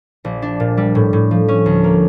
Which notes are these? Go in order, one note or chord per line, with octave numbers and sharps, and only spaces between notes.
A#1
D4
A#2
G3
A2
A2
F3
C#4
D2
A#3